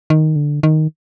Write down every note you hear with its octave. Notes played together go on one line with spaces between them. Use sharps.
D#3
D3
D#3